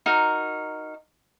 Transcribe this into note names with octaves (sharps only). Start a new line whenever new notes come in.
D#4 F#4 A#4